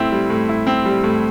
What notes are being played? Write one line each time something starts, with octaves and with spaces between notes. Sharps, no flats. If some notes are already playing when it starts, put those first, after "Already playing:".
Already playing: A2 C4 E4
G3
A2
E4
C4
G3
A2